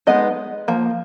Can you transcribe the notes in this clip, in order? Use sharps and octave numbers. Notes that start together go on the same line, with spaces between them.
G#3 B3 D#4 D#5
F3 A#3